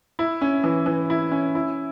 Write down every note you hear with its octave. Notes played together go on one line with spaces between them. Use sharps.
E4
C#4
E3
E3
E4
C#4
E4